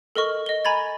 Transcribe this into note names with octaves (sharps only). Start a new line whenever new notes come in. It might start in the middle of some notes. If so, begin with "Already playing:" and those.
A4 A#4 D#5 C#6 F6
D#5 G7
G#5 A#5 B5 G#6 A6